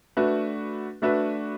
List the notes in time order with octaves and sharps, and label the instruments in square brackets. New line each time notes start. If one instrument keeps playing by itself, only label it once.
[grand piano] A3 D4 F#4 B4 E5
A3 D4 F#4 B4 E5